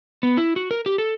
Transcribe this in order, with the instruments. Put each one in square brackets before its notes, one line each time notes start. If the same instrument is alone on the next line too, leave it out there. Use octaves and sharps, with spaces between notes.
[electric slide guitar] B3
E4
F#4
A#4
G4
A4